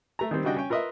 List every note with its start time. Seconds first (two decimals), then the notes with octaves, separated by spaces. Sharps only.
0.19 A3 A#5
0.31 D#3 G3 C4
0.44 C#3 G3 D4 F#4 D#5 G5
0.56 C#4 C#5 G5
0.70 F4 A#4 B4 D#5 E5